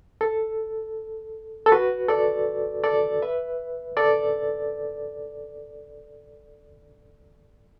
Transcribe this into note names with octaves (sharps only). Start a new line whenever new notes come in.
A4
A4
F#4 B4
A4 D5
A4 D5
B4 E5
A4 D5